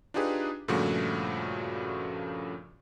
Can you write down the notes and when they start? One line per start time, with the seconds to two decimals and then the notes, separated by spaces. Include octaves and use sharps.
0.14 D4 D#4 F4 G4 G#4 B4
0.68 G2 A#2 C#3 F3 A3 F#4